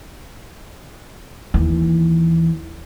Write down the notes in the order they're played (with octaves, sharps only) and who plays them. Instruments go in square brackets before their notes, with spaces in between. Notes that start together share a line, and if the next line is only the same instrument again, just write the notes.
[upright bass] D#2 E3